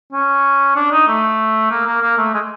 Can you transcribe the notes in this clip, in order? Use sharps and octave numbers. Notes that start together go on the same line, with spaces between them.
C#4
D4
D#4
A3
A#3
A#3
A#3
A3
G#3